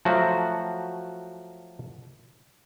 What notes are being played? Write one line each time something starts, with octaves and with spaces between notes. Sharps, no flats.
F3 F#3 A3 F#4